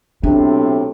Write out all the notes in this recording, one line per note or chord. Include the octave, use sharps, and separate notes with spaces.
B1 A2 C3 D4